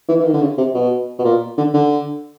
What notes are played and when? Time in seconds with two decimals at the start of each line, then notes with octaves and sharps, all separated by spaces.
0.09 E3
0.20 E3
0.25 D#3
0.33 D3
0.41 C#3
0.58 C3
0.74 B2
1.19 B2
1.25 A#2
1.57 D3
1.74 D3